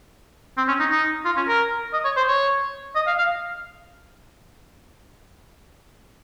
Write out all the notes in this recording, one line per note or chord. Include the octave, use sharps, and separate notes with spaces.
C4
C#4
D#4
D#4
F4
C#4
A#4
D#5
C#5
C5
C#5
D#5
F5
F5